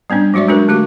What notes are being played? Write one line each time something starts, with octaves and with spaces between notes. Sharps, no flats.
G3 B3 C#4 D4
F#3 G#3 F#4 D5 E5
G#3 C#4 D4 F#4 A#4 B4
D3 A3 F#4 G4 D6